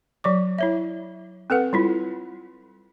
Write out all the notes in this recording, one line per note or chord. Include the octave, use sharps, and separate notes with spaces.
F#3 D5 D6
E4 C#5 E5
C4 A4 B4 F#5
G3 E4 F4